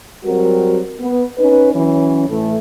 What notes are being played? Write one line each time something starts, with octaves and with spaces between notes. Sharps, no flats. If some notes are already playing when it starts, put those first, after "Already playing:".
F#3 G3 C4 F#4 A#4
B3
C#4 D#4 B4
E3 F#3 C#4
A2 E3 A3